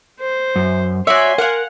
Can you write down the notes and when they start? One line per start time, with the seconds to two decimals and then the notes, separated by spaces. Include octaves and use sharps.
0.20 C5
0.56 F#2
1.07 F#4 C#5 D5 E5 G#5 C6
1.38 A#4 F5 F#5